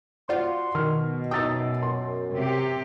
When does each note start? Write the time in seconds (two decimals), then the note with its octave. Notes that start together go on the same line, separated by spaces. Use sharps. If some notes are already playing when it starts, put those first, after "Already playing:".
0.29 F4 F#4 C5 D5 F#5 C6 C#6
0.75 B2 D#3 F6
1.31 F#2 D#4 G5 D#6 E6 A6
1.82 C6
2.35 C3 G4